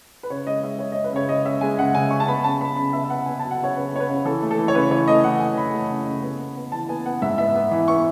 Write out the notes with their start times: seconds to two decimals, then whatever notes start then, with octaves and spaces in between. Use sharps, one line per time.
0.23 B4
0.30 C#3 C#5
0.46 G#3 D#5
0.63 G#3 E5
0.79 C#4 C#5
0.92 C#4 D#5
1.04 B4
1.13 C#3 C#5
1.29 G#3 D#5
1.45 C#4 E5
1.61 G#3 G#5
1.78 C#3 F#5
1.95 C#3 G#5
2.11 C#4 C#6
2.20 A5
2.28 B3 B5
2.44 C#3 A5
2.61 B3 B5
2.77 C#3 B5
2.93 B3 E5
3.04 E5
3.10 B3 F#5
3.26 B3 G#5
3.39 F#3 A5
3.51 F#5
3.60 C#3 C#5
3.76 C#3 B4
3.93 B3 C#5
4.00 B4
4.09 C#3
4.25 E3 A4
4.42 A3
4.51 A4
4.58 E3
4.68 C#5
4.74 C#3 B4
4.91 E3 C#5
5.08 A3 D#5
5.24 E3 F#5
5.40 E3 G#5
5.57 E3 B5
5.74 A3
5.90 C#3
6.06 C#3
6.22 B3
6.39 B3
6.56 B3
6.72 E3 A5
6.89 B3 G#5
7.06 B3 F#5
7.22 G#2 E5
7.38 B3 E5
7.55 B3
7.71 E3
7.88 B3 C#6